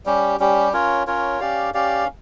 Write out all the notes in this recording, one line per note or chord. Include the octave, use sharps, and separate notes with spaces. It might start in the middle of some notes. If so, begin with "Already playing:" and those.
G3 C#4 G4
G3 C#4 G4
C#4 F4 A#4 C#5
C#4 F4 A#4 C#5
C#4 G4 D5 F5
C#4 G4 D5 F5